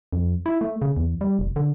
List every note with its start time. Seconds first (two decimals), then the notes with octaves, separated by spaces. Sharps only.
0.13 F2
0.46 E4
0.61 A3
0.82 C#3
0.97 E2
1.21 G3
1.39 F1
1.56 D3